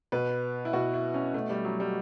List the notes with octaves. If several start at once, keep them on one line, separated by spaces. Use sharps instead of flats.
B2 B4
E4
B2 F#4
E4
C#4
B2 A3
G3
F#3
G3